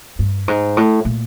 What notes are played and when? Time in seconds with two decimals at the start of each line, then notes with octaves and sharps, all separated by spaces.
0.19 G2
0.48 G#2
0.77 A2
1.05 A#2